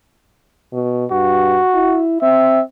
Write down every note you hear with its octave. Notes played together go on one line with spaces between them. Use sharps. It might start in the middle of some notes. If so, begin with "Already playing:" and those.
B2
G2 F#4
E4
C4 E5